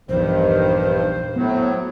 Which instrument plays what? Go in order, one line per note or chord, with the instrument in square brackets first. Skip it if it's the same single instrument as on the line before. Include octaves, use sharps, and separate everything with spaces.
[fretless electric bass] A#1 E2 [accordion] G2 D#3 [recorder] C5
[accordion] A2 F#3 [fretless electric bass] B3